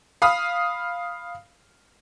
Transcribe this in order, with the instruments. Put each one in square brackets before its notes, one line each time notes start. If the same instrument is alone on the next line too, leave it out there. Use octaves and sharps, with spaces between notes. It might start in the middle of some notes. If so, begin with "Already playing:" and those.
[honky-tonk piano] F5 B5 D#6